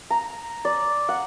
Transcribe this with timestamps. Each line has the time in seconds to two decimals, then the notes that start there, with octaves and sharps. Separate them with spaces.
0.10 A#5
0.65 D5
1.09 F#5